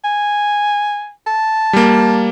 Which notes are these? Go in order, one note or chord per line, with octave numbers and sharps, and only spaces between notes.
G#5
A5
G3 A#3